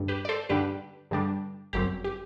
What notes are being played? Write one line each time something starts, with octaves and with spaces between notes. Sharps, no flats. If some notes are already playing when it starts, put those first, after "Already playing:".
Already playing: G2 D3 G3 D4
G4 B4
D5
A4 C5
G2 D3 G3 D4 G4 B4
G2 D3 G3 D4
G1 F#2 F#3 C4 G4
G4